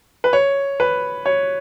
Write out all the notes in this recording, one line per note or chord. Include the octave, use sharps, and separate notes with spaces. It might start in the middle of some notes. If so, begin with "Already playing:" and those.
B4
C#5
B4
C#5